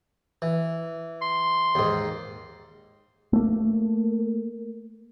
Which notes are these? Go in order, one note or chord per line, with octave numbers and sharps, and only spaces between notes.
E3
C6
D#2 G#2
A3 A#3